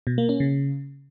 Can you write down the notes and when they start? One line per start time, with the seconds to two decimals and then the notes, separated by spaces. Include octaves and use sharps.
0.07 B2
0.18 A#3
0.29 C#4
0.40 C#3